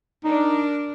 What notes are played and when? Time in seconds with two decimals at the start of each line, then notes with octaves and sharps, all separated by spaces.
0.25 D4 D#4 A#4